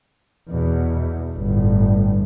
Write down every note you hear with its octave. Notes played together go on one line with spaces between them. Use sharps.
E2 B2
G1 A2